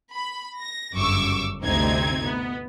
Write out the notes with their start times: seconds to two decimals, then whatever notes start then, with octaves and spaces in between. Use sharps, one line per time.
0.15 B5
0.60 A#6
0.95 G1 F#2 C#3 C#6 D6 E6
1.63 G1 D2 C3 C4 D#4 G#6
2.25 B3